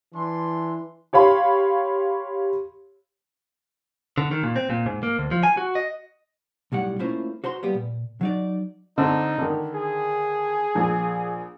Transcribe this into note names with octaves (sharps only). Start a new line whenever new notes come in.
E3 D4 C6
G4 C#5 F5 B5 C6
D3
D#3
A#2
C4
A#2
G#2
A#3
D2
F3
G#5
F#4
D#5
B1 A2 G3 F#5
A3 A#3 C#4 E4 F4 C5
F#4 C5 A#5 C6
F#3 G3 A#3 B3 G4
A#2
F#3 D#4 D5
D3 C4 D4 D#4
D3 D#3
G#4
A#1